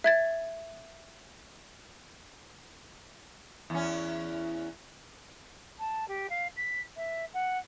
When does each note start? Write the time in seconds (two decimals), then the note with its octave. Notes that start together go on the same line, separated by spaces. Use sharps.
0.04 E5 G#6 A6
3.70 E2 C#4
5.79 A5
6.08 G4
6.30 F5
6.57 B6
6.97 E5
7.34 F#5